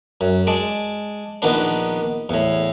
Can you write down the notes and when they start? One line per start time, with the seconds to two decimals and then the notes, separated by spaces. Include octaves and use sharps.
0.21 F#2
0.47 G#3 D5 A5
1.42 A#1 D#3 B3 D4
2.29 E2 A2